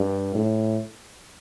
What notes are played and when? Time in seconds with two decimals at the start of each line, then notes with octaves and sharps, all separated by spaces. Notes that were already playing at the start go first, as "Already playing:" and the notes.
Already playing: G2
0.35 A2